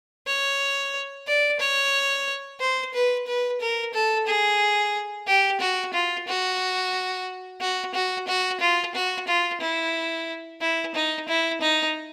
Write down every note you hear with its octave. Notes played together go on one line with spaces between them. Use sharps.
C#5
D5
C#5
C5
B4
B4
A#4
A4
G#4
G4
F#4
F4
F#4
F#4
F#4
F#4
F4
F#4
F4
E4
E4
D#4
E4
D#4